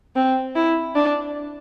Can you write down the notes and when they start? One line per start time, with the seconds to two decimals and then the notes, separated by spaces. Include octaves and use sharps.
0.16 C4
0.55 E4
0.95 D4